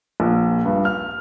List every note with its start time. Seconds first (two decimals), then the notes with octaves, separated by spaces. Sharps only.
0.20 A#1
0.66 G2
0.85 F6